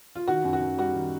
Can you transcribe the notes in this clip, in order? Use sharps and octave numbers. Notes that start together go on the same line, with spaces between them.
F4
D#3 F#4
F#2
F#4
F#2
G3 F#4
D#3